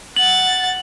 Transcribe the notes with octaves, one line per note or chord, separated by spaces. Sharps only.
F#5 A6 F#7